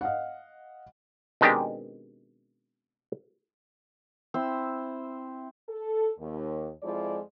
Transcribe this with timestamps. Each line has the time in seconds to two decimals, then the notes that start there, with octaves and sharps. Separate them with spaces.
0.01 D#5 F5 F#5
1.41 B2 D#3 G#3 C4 D4 G4
4.34 C4 E4 C5 E6
5.69 A4
6.19 D#2
6.83 F2 F3 G#3 E4 D5